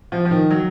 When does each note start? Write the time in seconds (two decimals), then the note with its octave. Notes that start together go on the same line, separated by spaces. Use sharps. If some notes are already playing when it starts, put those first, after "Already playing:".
0.12 F3
0.25 F3
0.31 D#3
0.51 F#3